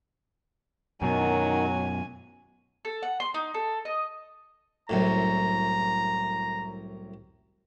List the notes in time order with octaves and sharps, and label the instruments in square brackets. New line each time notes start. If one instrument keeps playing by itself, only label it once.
[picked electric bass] F#2 B2 [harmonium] D#3 [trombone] F#3 [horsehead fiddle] G#5
[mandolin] A4
F#5
C6
D#4
A4
D#5
[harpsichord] C2 F#2 A2 [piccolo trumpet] A#5